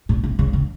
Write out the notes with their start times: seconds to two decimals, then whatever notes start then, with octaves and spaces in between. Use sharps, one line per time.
0.09 A#2
0.24 C3
0.39 C#3
0.53 D#3